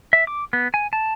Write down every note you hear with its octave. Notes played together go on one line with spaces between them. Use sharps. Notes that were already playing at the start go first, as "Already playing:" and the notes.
E5
D6
B3
G#5
A5